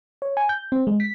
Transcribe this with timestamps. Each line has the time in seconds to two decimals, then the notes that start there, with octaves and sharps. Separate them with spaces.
0.22 C#5
0.37 G#5
0.49 G6
0.72 C4
0.87 G#3
1.00 B6